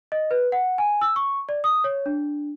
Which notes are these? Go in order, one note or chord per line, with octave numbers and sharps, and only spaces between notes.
D#5
B4
F#5
G#5
E6
C#6
D5
D#6
C#5
D4